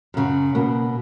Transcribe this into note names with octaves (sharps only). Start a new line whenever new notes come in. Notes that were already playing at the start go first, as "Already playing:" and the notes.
F#2 C#3 F#3
B2 A#3